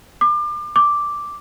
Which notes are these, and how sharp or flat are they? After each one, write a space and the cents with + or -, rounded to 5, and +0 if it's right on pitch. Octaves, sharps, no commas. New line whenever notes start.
D6 +30
D6 -5